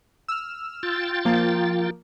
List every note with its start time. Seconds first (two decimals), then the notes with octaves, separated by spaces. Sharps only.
0.28 E6 F6
0.83 F4 G5 A6
1.25 F3 A#3